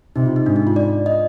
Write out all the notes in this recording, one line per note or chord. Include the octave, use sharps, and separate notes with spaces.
C3 D#4
F4
D#4
G#2 D4
D#4
F4
D5
D#5